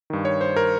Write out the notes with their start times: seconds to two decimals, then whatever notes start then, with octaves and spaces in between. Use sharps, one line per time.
0.10 G2 D#3
0.25 C#5
0.41 C5
0.56 A#4